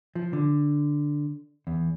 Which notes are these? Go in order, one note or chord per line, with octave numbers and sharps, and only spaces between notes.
F3
D3
E2